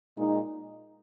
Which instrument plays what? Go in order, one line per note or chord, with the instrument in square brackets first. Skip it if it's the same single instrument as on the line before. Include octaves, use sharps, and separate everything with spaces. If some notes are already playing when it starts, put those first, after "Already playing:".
[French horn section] A#2 G#3 D#4